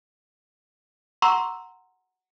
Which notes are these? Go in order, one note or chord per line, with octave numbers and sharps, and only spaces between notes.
F#5 A#5 C6 C#6 E6